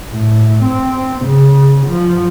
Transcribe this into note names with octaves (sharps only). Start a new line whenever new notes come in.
A2
C4
C#3
F3